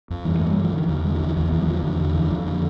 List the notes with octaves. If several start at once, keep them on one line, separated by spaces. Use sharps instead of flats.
F2
G2 E3
G2 A3
G3
G2
F3
D3 E3
E2 D3
D3 G3
F3
E2 E3
E2 D3
E2 E3
G3
D3 F3
E2 D3
D3
F2 E3
F2 F3
D3